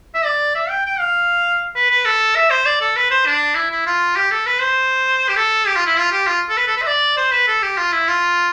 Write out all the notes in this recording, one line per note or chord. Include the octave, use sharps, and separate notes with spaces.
E5
D5
E5
G5
G5
F5
B4
B4
A4
E5
C5
D5
A4
B4
C5
D4
E4
E4
F4
G4
A4
B4
C5
G4
A4
G4
F4
E4
F4
G4
F4
A4
B4
A4
B4
E5
D5
C5
B4
A4
G4
F4
E4
F4